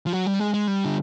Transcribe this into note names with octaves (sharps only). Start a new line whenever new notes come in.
F3
F#3
G3
G#3
G#3
G3
D3